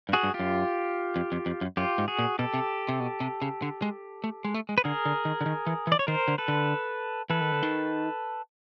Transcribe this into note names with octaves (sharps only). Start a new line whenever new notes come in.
G2
F#4 G#4
G2
F4 G4
F#2
F2
F2
F2
F#2
F#2 F4 G4
G#2
F#4 G#4
A#2
B2 G4 A4
C3
C3
B2
C3
C#3
D3
G#3
A3
G#3
A3
G#3
B4
D3 G#4 A#4
D3
D#3
D3
D#3
E3
E3
D5
C#5
D#3 A#4 C5
D3
A4 B4
D3
E3 A4 B4
D#3
D3
D#3